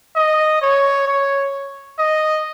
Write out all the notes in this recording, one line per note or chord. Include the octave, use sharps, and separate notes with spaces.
D#5
C#5
C#5
D#5